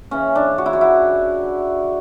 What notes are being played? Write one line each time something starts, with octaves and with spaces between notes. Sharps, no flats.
C#3 E3 C#4
D4
F#4
E4
F#4
E4